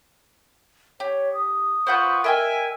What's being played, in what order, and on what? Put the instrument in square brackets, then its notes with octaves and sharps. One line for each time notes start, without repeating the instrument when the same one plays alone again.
[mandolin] G4 [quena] C#5
[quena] D#6
[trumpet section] F4 B4 C#6 [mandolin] C5 F#5 G6
[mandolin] A#4 D#5 G5 [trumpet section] E5 G#5